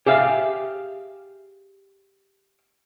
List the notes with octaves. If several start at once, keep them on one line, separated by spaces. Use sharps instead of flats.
G4 G#4 E5 F5